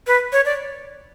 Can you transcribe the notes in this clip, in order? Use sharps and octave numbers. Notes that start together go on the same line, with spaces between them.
B4
C#5
D5